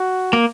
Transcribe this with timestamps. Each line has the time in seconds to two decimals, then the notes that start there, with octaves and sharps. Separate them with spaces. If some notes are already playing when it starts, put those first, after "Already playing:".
Already playing: F#4
0.33 A#3